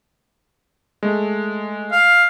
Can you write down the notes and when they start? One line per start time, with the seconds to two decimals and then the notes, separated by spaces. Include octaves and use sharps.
1.03 G#3 A3
1.92 F5